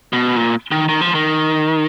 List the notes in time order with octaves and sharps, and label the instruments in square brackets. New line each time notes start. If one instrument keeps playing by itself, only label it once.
[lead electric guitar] B2
A#2
D#3
D#3
F3
D#3